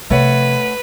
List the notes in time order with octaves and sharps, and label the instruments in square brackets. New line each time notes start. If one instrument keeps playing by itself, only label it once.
[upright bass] C3 F3 [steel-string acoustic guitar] A3 C#5 F#5 [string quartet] B4